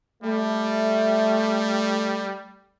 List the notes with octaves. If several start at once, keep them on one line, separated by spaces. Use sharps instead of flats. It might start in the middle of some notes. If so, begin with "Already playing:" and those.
G3 A3